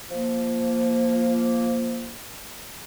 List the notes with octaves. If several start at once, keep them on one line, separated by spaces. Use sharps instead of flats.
F3 A#3